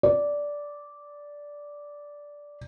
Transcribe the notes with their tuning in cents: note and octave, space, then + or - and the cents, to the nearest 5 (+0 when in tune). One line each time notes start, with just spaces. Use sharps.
D5 -10